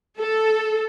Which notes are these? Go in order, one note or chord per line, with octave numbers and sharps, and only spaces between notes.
A4